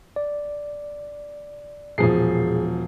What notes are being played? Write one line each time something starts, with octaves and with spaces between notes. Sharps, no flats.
D5
E1 A#2 F3 G#4 C7